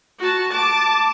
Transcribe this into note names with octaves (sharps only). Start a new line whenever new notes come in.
F#4 A5
A5 D6